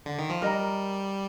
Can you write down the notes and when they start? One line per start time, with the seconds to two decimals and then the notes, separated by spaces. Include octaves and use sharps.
0.06 D3
0.18 D#3
0.30 F3
0.42 G3 A#4 D#5 A#5